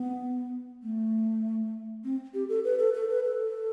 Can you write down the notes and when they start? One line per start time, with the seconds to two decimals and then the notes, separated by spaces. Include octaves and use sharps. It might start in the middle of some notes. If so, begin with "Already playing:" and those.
Already playing: B3
0.83 A3
2.04 C4
2.34 G4
2.49 A4
2.64 B4
2.79 A4
2.94 A4
3.09 B4
3.25 A4